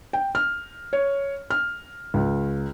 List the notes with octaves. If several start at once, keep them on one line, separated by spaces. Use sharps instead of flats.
G5
F6
C#5
F6
C#2